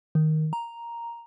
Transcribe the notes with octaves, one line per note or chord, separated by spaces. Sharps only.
D#3
A#5